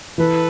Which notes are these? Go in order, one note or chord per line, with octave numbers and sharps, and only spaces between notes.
E3 A4 B4